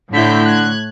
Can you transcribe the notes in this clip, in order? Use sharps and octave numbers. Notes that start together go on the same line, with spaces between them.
A2 D3 E4 G6 B6
F#6 G#6